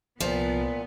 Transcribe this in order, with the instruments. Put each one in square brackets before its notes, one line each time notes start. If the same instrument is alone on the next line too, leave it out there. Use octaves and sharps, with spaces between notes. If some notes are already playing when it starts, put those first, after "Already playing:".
[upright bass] C2 [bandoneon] A#2 [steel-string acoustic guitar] F3 [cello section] B3